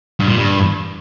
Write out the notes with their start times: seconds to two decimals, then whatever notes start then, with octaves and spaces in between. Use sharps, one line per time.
0.20 G2
0.28 A#2
0.36 G2